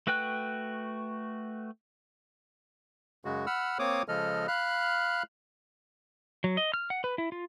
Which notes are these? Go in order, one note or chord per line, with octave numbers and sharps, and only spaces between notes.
A3 F#4 B4 G5 F#6
F#2 C#3 G#3 F#4
F#5 B5 E6 F6
A#3 C4 C#5 D6 D#6
C#3 F3 G#3 A4 D#5 F6
F5 B5 F6 F#6
F#3
D#5
F6
F#5
B4
E4
F4